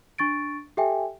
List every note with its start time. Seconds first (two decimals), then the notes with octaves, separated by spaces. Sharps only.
0.18 D4 C#6 A6 D7
0.77 G4 A4 E5 G5 G#5